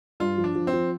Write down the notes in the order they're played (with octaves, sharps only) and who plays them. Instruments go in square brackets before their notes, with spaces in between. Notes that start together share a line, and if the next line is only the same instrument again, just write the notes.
[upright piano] G2 [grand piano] F4
[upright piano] F3
[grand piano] D4
[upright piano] F3
[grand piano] C4
[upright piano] F3